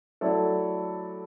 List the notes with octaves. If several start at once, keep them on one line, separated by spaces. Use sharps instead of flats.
F#3 A3 E4 A4 D5